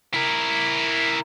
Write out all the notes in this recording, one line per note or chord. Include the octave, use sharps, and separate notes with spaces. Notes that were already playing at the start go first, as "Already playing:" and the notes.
E4 A#4